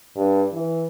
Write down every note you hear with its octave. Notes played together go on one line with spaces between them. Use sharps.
G2
E3